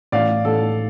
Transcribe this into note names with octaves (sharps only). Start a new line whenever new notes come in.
A1 D5 F5
A1 A4